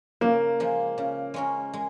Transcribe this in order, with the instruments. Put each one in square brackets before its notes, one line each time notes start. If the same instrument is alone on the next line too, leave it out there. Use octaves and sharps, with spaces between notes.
[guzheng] C#3 [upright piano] A#3
[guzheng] F3 G#3
C#3
G#3 C#4 A#4
G#3